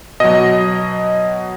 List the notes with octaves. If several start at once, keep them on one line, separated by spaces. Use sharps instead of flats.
B2 F#3 D#5